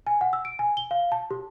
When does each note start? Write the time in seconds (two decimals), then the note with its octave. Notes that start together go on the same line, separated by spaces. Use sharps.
0.07 G#5
0.21 F#5
0.33 E6
0.45 D7
0.59 G#5
0.77 G7
0.91 F5
1.12 A5
1.31 G4